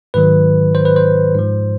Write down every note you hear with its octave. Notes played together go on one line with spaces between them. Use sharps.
G#2 D#3 F#3 B4
C5
B4
C5
G#2 F3